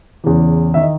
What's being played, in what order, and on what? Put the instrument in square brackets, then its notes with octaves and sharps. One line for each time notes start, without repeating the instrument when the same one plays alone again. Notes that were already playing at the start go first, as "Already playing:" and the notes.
[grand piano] E2 C#3 E3
D#3 E5
D#5